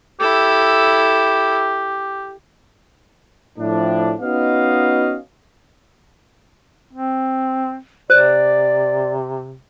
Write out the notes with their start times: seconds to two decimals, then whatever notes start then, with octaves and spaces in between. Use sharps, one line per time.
0.20 E4 G4 A4
3.59 A2 F3 D4
4.21 B3 C#4 D#4 F#4 D#5 F5
6.93 C4
8.10 C3 C5 D5